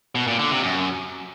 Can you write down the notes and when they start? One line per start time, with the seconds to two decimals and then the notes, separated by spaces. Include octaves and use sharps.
0.15 B2
0.27 A#2
0.39 D3
0.51 C3
0.63 F#2